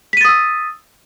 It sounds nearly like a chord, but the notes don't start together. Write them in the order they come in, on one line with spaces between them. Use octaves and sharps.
B6 D#7 A6 D#6 E6